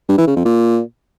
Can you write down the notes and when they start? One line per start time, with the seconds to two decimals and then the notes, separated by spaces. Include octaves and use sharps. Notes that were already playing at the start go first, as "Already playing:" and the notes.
0.09 G2
0.18 E3
0.27 C#3
0.36 F2
0.45 A#2